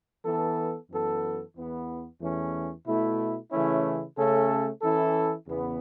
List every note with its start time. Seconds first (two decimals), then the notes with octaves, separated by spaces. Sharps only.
0.24 E3 B3 A4
0.90 F#2 E3 B3 A4
1.55 E2 E3 B3
2.20 E2 E3 A3 C#4
2.86 B2 A3 E4
3.50 C#3 E3 A3 C#4 E4
4.17 C#3 A3 C#4 A4
4.82 E3 C#4 E4 A4
5.47 E2 C#3 E3 B3